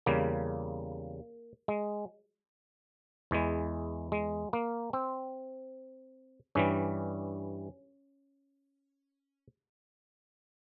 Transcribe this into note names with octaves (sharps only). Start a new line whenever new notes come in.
E2 C#3 G3 A#3
G#3
E2 E3 G#3
G#3
A#3
C4
G2 E3 G3 C#4